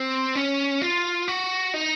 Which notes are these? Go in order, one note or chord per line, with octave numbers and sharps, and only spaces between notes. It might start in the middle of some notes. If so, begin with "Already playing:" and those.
Already playing: C4
C#4
F4
F#4
D#4